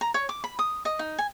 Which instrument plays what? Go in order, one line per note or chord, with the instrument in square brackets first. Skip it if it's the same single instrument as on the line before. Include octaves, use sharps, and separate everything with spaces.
[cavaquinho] A#5
C#5
D6
B5
D#6
D#5
D#4
G#5